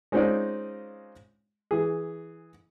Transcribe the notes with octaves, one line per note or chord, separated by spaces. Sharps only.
G#3 C4 C#4 D#4 F4 D5
E3 G#4